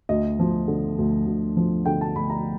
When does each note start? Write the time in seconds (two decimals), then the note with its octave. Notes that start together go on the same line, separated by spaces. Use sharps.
0.09 D2 D#5
0.39 F3
0.68 D3
0.98 D2
1.27 D2
1.57 F3
1.85 D3 G5
2.01 A5
2.15 D2 B5
2.30 A#5